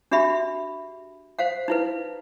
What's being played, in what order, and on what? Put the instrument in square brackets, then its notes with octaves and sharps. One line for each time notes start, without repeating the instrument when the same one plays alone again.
[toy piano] D4 F#4 G4 E5 B5
C5 F5 F#5
D#4 E4 B4